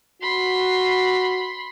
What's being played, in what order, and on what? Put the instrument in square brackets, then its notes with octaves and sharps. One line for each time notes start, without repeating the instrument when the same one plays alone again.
[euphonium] F#4 [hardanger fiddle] B5 C6